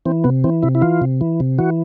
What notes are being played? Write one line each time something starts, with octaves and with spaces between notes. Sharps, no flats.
E3 C4
C3 B3
E3 C4
C3 E4
E4
E3 F4
C3
E3
C3
E3 F#4